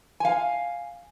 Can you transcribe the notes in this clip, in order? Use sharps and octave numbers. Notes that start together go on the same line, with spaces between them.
F5 G#5